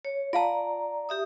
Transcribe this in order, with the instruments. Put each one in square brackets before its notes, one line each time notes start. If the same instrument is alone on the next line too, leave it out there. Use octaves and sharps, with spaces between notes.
[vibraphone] C#5
[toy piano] F4 F5 A5 [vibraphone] D5 A#5
[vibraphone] G4 E5 D#6